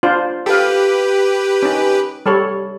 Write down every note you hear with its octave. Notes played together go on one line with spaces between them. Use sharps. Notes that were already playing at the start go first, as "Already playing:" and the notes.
D4 F4 C5
G4 A4 B4 F5
C#4 D#4
G3 A4 C#5